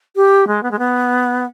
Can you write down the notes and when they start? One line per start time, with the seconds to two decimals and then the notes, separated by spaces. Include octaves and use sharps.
0.16 G4
0.47 G#3
0.63 B3
0.71 G#3
0.78 B3